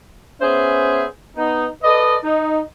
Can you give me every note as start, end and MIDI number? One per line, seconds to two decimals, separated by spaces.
0.41 1.05 59
0.41 1.05 61
0.41 1.05 68
0.41 1.05 72
0.41 1.05 76
1.37 1.68 59
1.37 1.68 63
1.83 2.18 69
1.83 2.18 71
1.83 2.18 74
1.83 2.18 75
2.24 2.62 63